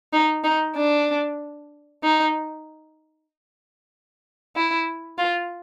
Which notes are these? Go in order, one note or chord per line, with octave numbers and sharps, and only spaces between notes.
D#4
D#4
D4
D#4
E4
F4